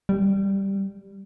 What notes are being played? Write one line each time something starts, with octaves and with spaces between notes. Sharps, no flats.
G3